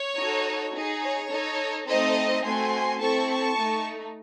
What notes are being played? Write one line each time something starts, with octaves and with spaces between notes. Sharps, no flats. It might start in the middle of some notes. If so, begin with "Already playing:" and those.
Already playing: C#5
D#4 F#4 A4
D#4 G#4
C#5
D#4 A4
A3 C4 D#4 A4 C5 D#5
A3 C4 F#4 G#5 C6
C4 E4 A4 A5 C#6
A5 C#6
A3 D#4